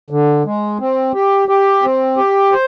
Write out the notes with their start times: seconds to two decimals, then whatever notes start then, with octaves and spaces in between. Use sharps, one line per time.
0.10 D3
0.45 G#3
0.80 C4
1.14 G4
1.48 G4
1.82 C4
2.17 G4
2.52 C5